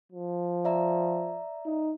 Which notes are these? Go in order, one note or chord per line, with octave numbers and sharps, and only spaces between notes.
F3
D5 E5 A#5
D#4